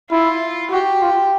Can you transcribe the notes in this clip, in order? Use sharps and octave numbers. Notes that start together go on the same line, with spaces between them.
E4 F4
F#4 G4
F4